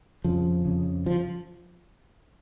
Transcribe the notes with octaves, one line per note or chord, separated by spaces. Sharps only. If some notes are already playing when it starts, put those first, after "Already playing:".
F2 C#3 F3
F2 C#3
F3